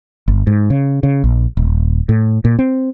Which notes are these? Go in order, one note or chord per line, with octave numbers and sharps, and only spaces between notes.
G1
G#2
C#3
C#3
A#1
D#1
A2
A#2
C4